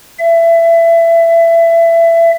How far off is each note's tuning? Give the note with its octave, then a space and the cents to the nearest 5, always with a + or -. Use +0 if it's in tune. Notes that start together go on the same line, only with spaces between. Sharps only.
E5 +25